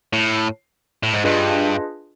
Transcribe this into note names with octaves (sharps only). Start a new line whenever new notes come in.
A2
A2
G#2
G2 D4 F4 G#4 B4 D#5